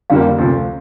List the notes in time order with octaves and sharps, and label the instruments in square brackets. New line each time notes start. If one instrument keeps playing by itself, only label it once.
[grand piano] F2 D3 G3 A#3 [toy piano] F5
[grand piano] D2 C3 F3